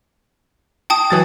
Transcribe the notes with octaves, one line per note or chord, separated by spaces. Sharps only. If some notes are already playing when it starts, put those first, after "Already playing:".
G5 A5 D#6
E3 F#3 A6